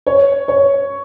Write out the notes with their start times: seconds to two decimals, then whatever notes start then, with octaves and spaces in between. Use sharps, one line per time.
0.07 C#5
0.48 C#5